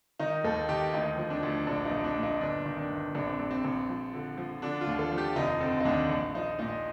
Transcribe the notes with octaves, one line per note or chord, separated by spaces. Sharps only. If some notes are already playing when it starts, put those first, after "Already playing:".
D#3 D#4
D#2 A4
D#3 G4
D2 D#4
F3
D4
D2
A#1 D4
D#4
A#1
D4
A#2
D#4
G1 D4
D#3
D4
G1
A#1 D4
C4
A#1
C4
A#1
F3
D3
F3
D3 D4
F4
D#2
A4
F3
G4
F1 D#4
D3 C4
D#4
D#2 D4
A#1
F3 D#4
A#2 D#4